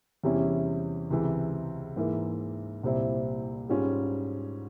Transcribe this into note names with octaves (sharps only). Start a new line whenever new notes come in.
E2 C3 G3 C#4 E4
C#2 C3 E3
G#2 E3 A#3 E4
C2 A#2 G3 C4 E4
G#2 G3 C#4 F4